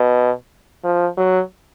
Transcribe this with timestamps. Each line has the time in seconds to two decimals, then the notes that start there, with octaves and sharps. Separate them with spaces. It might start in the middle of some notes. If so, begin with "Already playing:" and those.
Already playing: B2
0.84 F3
1.17 F#3